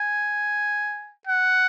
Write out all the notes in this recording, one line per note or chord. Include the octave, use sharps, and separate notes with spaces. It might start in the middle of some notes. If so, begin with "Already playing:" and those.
Already playing: G#5
F#5